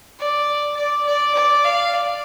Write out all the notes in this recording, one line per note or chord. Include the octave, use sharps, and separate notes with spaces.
D5
D5
D5
D5
F5
D5